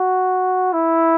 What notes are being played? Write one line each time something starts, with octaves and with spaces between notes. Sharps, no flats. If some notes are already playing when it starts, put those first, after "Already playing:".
Already playing: F#4
E4